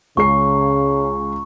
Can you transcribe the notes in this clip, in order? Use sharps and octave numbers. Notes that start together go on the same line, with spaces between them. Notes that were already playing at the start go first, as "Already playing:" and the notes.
C#2 C#3 G#4 C#6 C7